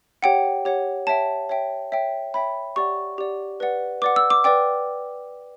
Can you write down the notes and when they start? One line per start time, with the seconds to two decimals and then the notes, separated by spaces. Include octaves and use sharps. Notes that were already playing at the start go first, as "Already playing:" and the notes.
0.23 G4 C#5 F#5 G5
0.65 G4 C#5 F#5
1.07 C#5 E5 G5 A5
1.49 C#5 E5 G5
1.92 C#5 E5 G5
2.34 C#5 E5 G5 B5
2.76 G4 D5 F#5 C#6
3.18 G4 D5 F#5
3.60 B4 D5 F#5
4.02 B4 D5 F#5 D6
4.16 E6
4.30 D6
4.44 B4 D5 G5 D6